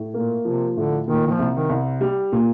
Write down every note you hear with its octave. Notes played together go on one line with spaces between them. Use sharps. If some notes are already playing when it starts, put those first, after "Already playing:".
Already playing: A2
A#2 A#3
C3 F3
A2 D3
A#2 D#3
D#3
F3
C2
D#3
C2
G3
A#2